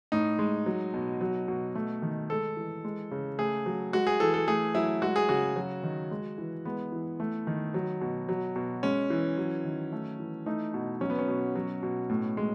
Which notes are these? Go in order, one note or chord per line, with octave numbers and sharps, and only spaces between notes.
A2 D#4
G#3
F#3
B2
F#3
B2
A3
D#3
G#3 A4
E3
G#3
C#3
A3 G#4
F#3
G#3 F#4
G#4
E3 A4
A4
A3 G#4
F#3 E4
G#3 F#4
G#4
C#3 F#4
F#3
D#3
G#3
E3
G#3 B3
E3
A3
D#3
F#3
B2
F#3
B2
G#3 C#4
E3
F#3
D#3
A3
E3
A3 D#4
B2
F#3 C#4
B3
C#4
B2
F#3
B2
A2
G#3